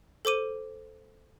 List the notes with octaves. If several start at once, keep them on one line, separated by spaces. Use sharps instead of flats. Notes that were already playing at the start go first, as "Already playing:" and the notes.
A4 C5 D6 D#7